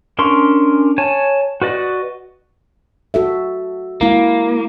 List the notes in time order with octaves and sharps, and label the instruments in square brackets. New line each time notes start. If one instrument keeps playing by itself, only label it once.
[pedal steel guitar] C#4 D4 A#4 C6 C#6
C#5 G#5 A5
F#4 B4 D5 D#5
[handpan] F#4 A4 E5
[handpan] G#3 E4 [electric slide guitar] A#3